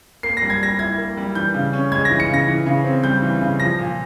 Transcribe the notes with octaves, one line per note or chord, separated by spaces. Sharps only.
A#3 C7
A#6
G3
G#6
G3 A#6
E4 G#6
A#3
G3
E3 G6
C#3
C#4
G#3 G#6
A#6
E3
C#7
C#3
A#6
E3
C#3
C4
G3 G6
E3
C#3
F3 A#6
A#2